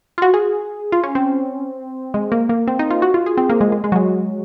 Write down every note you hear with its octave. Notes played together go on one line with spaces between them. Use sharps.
F4
F#4
G#4
F4
C#4
C4
G#3
A#3
A#3
C4
D#4
F4
F#4
F4
G#4
C4
A#3
G#3
G#3
G#3
F#3
G#3